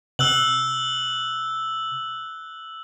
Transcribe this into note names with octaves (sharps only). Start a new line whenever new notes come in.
C3 E6 F#6 F#7